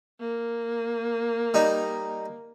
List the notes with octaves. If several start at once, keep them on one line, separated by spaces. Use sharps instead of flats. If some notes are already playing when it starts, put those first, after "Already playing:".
A#3
G3 D#4